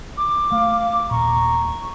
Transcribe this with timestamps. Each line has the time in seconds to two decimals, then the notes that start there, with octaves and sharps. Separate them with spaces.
0.17 D6
0.52 A3 F5
1.11 D#1 A#2 A#5 C#6